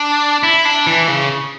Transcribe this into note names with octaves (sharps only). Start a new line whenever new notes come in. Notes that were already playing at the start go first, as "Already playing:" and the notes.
Already playing: D4
E4
D4
E3
C#3